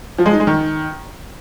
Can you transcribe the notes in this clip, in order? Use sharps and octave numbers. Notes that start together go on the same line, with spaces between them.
F3
G#3
D#4
G#3
D#3